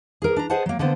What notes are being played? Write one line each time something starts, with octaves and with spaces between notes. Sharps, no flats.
G#4 A#4
D4 A#5
G#4 C5 D#5 F#5 A5
F#3 A#3
D3 A#3 B3 A4 C5